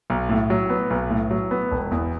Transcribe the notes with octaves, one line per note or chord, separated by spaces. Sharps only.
B1
A2
F#3
B3
B1
A2
F#3
B3
E1
E2